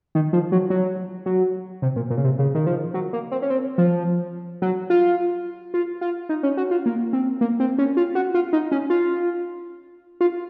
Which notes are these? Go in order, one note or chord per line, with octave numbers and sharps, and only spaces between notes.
D#3
F3
F#3
F#3
F#3
C3
A#2
A#2
C#3
C3
C#3
D#3
F3
F#3
A#3
C4
C#4
C4
F3
F#3
F4
F4
F4
D#4
C#4
F#4
F4
A#3
C4
A#3
C4
C#4
F4
F#4
F4
D#4
C#4
F4
F4